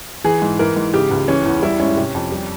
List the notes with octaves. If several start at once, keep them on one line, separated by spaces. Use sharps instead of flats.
E3 G#4
G#2
E3 A#4
G#2
C#3 G4
C#2
E3 C#4
E2
G3 E4
G#2 C#4
C3
F2
G3